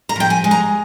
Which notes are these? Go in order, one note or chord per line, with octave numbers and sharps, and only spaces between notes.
A#5
F3 G5
G#5
G#3
A#5